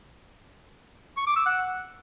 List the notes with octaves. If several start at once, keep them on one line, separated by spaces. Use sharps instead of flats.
C#6
D6
E6
F#5